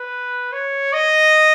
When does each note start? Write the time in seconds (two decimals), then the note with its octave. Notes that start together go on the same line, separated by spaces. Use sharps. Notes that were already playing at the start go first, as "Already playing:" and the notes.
Already playing: B4
0.53 C#5
0.93 D#5